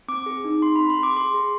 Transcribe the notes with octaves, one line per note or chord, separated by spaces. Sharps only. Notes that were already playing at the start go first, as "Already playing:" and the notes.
C4 D6
G#4
D#4
C4 C6
C4 B5
C6
G#4 D6
G#4 C6
G#4